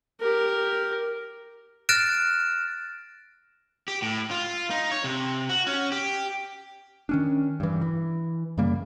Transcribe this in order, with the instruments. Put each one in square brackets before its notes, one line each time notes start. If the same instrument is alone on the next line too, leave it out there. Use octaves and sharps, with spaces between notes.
[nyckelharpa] G4 A#4
[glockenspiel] F6 F#6 A6 A#6 D7 E7
[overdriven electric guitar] G4
A2
F4
D#4
C#5
C3
F#4
C#4
G4
[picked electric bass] D#3 C#4 D4
G2 E3
E3
F#2 C#3 G3 A#3